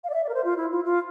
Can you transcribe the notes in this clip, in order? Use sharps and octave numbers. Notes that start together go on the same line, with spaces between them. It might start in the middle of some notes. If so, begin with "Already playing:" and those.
F5
D5
E5
D5
A#4
C5
F4
E4
F4
F4